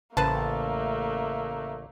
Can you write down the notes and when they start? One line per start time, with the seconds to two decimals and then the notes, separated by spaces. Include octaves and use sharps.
0.17 A1 C#3 A3 A#3 B4 C5 A5